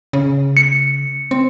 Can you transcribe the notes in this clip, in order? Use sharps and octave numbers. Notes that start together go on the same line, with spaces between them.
C#3
C#7
C4